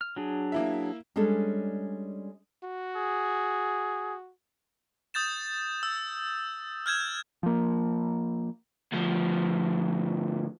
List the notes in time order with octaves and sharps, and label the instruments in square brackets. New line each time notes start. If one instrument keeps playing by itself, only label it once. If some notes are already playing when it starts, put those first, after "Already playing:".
[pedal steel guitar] F6
F#3 D4 G#4
[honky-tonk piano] A#3 E4 E5
[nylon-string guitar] G3 G#3 C#4 D4 A4
[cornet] F#4
[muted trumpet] G#4
[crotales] D#6 G6 A6 E7
E6
F6 G6 G#6 E7
[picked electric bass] F3 A#3
[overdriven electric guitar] D2 F3